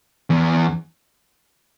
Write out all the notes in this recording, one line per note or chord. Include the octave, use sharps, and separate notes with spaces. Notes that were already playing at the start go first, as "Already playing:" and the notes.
E2